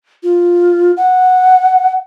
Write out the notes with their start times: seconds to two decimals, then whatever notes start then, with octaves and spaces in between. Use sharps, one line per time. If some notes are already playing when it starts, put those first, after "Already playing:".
0.23 F4
0.97 F#5